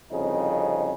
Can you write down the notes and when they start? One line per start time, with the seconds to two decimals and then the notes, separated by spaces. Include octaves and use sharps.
0.12 C2 F2 C#3 D#4